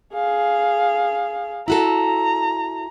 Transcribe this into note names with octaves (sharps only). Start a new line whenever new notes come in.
G#4 F5
E4 F#4 A4 A#5